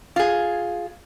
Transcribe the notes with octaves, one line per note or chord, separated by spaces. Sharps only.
F4 G#4